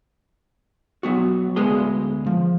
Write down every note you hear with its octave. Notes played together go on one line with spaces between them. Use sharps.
F#3 B3 F#4
D2 G#3 B3 G#4 C6
F3